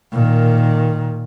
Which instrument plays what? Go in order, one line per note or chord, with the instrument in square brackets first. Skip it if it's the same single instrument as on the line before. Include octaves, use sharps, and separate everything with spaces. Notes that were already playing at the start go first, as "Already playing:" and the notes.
[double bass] A#2 D#3